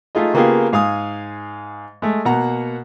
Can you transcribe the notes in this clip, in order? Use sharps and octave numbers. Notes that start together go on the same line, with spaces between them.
A3 D#4 F4 G#4 D#5
C#3 A#3 B3 F4 G4 G#4
G#2 F5 G#5 D#6
G#3 A3
B2 A#3 F#5 A#5